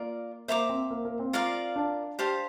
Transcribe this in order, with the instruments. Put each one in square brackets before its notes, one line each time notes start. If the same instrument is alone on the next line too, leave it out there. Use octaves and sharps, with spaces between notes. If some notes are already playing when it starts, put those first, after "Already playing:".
Already playing: [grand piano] A#3 [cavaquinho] F4 A#4 D5
[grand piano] A#3 [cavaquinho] C5 E5 A#5 D6
[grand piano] C4
A#3
A#3
C4
[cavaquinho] F4 A#4 D5 F5
[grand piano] D4
[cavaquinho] G4 C5 F5 A5